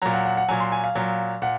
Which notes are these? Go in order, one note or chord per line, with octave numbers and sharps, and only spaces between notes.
A#2 F#3 A#5
F#5
F#5
F#5
A#2 F#3 G#5
C6
G#5
F5
A#2 F#3
A#2 F#5